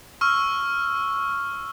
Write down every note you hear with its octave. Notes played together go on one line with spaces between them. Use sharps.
C#6 E6 F6